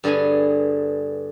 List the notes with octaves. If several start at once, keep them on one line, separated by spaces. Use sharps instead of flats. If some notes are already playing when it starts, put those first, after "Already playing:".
G2 D3 B3 G#4 G#5